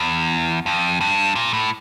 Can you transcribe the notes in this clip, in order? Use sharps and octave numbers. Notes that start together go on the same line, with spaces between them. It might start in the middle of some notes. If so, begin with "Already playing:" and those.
Already playing: E2
F2
G2
A#2
A2